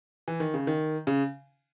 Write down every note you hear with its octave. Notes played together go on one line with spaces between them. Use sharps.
E3
D#3
C#3
D#3
C#3